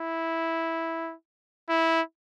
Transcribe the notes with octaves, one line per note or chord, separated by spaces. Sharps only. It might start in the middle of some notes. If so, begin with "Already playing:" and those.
Already playing: E4
E4